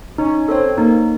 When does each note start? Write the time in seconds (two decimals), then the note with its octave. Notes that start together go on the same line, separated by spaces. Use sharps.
0.18 C#4 D#4
0.48 C4 A4 C#5
0.77 A#3 D#4